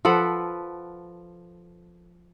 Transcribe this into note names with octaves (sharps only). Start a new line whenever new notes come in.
F3 A4 B4 F#5